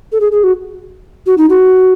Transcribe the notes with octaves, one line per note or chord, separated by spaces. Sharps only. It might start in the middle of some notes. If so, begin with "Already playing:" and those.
A4
G#4
G#4
F#4
F#4
D#4
F#4